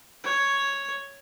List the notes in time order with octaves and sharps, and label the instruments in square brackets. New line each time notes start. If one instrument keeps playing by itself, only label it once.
[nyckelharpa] C#5